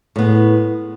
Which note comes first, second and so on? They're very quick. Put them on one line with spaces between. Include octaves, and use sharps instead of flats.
A2 B3 G#3